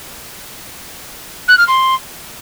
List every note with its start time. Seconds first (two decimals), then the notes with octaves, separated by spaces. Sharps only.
1.48 F#6
1.57 F6
1.67 C6